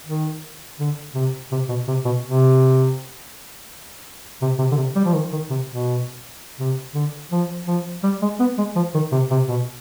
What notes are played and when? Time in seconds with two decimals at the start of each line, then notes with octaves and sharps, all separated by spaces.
0.06 D#3
0.79 D3
1.14 C3
1.52 C3
1.69 B2
1.88 C3
2.05 B2
2.24 C3
4.42 C3
4.59 C3
4.71 D3
4.77 C3
4.96 G3
5.05 F3
5.14 D#3
5.32 D#3
5.50 C3
5.68 B2
6.59 C3
6.94 D3
7.32 F3
7.67 F3
8.03 G3
8.22 G#3
8.40 B3
8.58 G#3
8.76 F3
8.94 D#3
9.12 C3
9.31 C3
9.48 B2